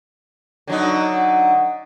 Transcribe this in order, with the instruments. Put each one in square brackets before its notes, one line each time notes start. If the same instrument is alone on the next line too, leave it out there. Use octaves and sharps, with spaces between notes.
[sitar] D3 F#3 D#4